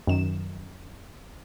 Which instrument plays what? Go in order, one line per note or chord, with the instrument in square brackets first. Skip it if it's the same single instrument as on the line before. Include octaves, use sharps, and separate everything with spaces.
[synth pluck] F#2 D#3 E7